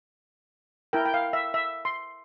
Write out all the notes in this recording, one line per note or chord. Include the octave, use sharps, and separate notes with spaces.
E4 A#4 G5
G5
F5
E5
E5
C6